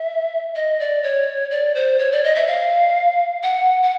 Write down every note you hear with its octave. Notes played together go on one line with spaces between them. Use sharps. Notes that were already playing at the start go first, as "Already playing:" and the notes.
Already playing: E5
D#5
D5
C#5
D5
C5
C#5
D5
D#5
E5
F5
F#5
F#5